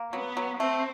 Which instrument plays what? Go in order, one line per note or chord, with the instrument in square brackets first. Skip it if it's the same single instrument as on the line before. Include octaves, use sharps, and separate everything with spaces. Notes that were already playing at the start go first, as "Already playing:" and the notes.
Already playing: [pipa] A#3
[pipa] F#3 [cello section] B3
[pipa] F#3
[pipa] A3 [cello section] C4